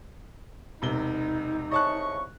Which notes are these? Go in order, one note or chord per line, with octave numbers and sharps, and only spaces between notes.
E1 C3 D#4 G7
C2 C#3 D#5 A5 C#6 F#6